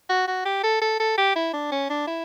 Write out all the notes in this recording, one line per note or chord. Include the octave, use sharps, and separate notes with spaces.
F#4
F#4
G4
A4
A4
A4
G4
E4
D4
C#4
D4
E4